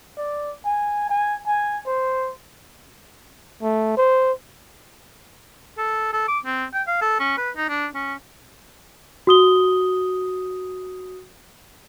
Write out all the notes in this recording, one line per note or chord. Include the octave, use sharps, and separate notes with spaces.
D5
G#5
G#5
G#5
C5
A3
C5
A4
A4
D6
C4
G5
F5
A4
C#4
B4
D#4
D4
C#4
F#4 D#6 G7